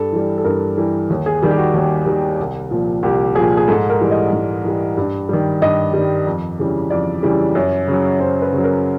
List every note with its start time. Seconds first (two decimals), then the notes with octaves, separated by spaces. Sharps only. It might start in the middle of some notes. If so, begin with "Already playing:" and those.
Already playing: G2 A4
0.12 E3 G3
0.38 A4
0.44 G2 A#4
0.77 E3 G3
1.10 D#2
1.26 G#4
1.43 D#3 G3
1.51 G4
1.58 F#4
1.74 D#2
2.06 D#3 G3
2.39 C2
2.71 A#2 F3
3.03 C2 G4
3.35 A#2 F3 G#4
3.57 G#4
3.68 G#2 A4
3.89 A#4
4.01 E3 G3
4.11 D#5
4.33 G#2
4.64 E3 G3
4.97 G2
5.29 D#3 G3
5.62 G2 D#5
5.93 D#3 G3
6.26 F2
6.59 C#3 E3 G3
6.90 F2 D5
7.23 C#3 E3 G3
7.55 F#2
7.88 C#3 F#3
8.20 F#2 C5
8.42 B4
8.53 C#3 F#3
8.64 A#4